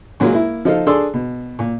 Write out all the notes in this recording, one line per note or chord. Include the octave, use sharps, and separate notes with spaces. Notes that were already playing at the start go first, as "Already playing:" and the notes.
A#2 F#3 G#3 A#3 F4
A#3 E4
F3 D#4 A4 F5
D4 G#4 A4 D5 C6 E6
B2
A#2